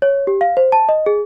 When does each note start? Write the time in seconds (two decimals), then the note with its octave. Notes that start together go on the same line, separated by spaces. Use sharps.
0.02 C#5
0.27 G4
0.41 F5
0.57 C5
0.72 A5
0.89 D#5
1.06 G#4